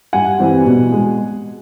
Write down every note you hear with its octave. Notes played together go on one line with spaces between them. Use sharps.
G2 F#5 G#5
E3 G3 C4
B2
G#3